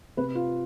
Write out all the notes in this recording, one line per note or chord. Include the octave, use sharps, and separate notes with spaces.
C3 B4
F4